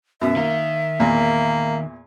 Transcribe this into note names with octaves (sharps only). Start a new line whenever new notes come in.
F#2 B2 E5
D#3 A#3
E2 A#2 A#3